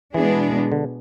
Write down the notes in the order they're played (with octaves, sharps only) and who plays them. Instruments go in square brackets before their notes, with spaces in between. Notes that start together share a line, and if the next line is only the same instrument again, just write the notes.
[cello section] B2 G#3 B3 D4 G#4 [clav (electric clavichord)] E3
[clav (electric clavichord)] D3